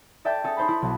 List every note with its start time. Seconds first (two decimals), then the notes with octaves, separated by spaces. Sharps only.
0.25 A4 D5 E5 G5 A5 G6
0.44 C#4 G#4 A4
0.57 D#4 C5 A5 B5
0.68 E4
0.82 B1